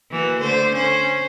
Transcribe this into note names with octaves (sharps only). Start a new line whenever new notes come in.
E3 A#3 F#4
D3 A3 C5
C#4 C5